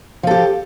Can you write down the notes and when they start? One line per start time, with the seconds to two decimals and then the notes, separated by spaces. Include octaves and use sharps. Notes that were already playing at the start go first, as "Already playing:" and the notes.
0.23 F3
0.27 A4
0.31 G4